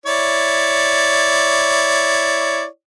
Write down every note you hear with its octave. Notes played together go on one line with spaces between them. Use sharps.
E4 C#5 D5